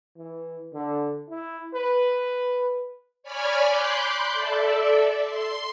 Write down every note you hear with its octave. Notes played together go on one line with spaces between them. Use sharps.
E3
D3
E4
B4
C#5 D5 G#5 B5 F6
B5 C6 D6 F#6 G6
A4 D5 E5
C6